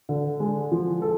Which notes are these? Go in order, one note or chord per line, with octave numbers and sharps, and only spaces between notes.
D3
G#3
F3
A4